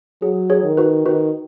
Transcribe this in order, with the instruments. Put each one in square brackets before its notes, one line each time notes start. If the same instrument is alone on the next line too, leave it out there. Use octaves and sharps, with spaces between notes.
[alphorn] F#3 [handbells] G#4
[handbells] G#4 C#5
[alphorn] D#3
[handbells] F#4 B4
[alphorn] D#3 [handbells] F#4 B4